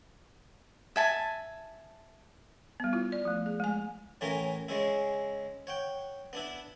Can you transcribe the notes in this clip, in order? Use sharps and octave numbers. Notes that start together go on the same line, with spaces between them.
E5 G#5 A5
G3 B3
E4 F4
D5
F3 A3
G#4
G#3 G#5
A2 E3 C#4 F4 A#4 A#5
C#3 G#3 C#4 E4
C#5 F#5 G5
B3 D4 E4